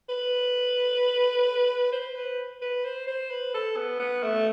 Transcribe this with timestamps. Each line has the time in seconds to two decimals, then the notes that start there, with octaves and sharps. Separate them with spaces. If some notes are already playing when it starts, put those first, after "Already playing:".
0.09 B4
1.92 C5
2.16 B4
2.62 B4
2.85 C5
3.07 C5
3.31 B4
3.54 A4
3.76 B3
3.99 B3
4.23 A3